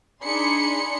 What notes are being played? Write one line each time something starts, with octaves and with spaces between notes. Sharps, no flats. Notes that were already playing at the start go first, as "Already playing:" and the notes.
D4 D#4 G#4 B5 C6 C#7